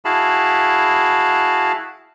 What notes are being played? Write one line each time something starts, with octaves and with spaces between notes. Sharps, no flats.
E4 F#4 G#4 F5 A5 B5